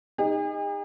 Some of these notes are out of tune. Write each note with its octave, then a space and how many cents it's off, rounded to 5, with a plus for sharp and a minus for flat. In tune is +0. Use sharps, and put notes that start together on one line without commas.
D#4 +0 G#4 -45